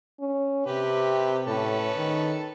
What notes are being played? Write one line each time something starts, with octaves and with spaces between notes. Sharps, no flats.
C#4
C3 G4 B4
A2 C#4 A4 B4
D#3